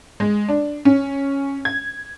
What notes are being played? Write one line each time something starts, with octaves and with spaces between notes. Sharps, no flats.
G#3
D4
C#4
G#6